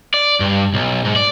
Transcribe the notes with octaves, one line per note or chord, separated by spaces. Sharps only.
D5
G2
B1
G#2
D5